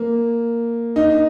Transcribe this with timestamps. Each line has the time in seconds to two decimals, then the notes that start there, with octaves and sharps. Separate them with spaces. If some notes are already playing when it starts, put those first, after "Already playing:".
Already playing: A#3
0.96 D#4